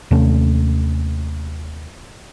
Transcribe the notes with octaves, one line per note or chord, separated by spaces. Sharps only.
D#2 C3 A3 C#4